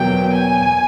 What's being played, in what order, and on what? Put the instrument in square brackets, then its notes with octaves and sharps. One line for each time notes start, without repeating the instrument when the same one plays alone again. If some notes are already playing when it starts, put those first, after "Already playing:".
Already playing: [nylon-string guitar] E2 B2 F#3 A#3 [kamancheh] G5
[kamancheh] G#5